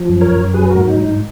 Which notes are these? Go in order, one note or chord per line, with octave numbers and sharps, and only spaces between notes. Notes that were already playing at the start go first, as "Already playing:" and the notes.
Already playing: F3
F#2
A#4 C#5
F#2
F#3 G#4 B4
F#4 A#4
G#2
D#4
G#2
D#4